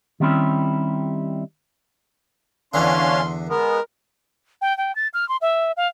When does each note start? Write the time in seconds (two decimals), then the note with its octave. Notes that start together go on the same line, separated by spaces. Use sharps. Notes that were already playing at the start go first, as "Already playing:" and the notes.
0.20 D#3 G3 C4 C#4 E4 G4
2.74 E2 D3 C#4 D4 F5 C6
3.49 G#3 B3 A#4
4.61 G5
4.77 G5
4.95 A6
5.14 F6
5.29 C6
5.41 E5
5.77 F5